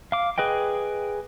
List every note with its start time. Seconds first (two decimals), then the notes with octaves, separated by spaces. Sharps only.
0.12 F5 D6
0.38 G#4 B4 D#5 G5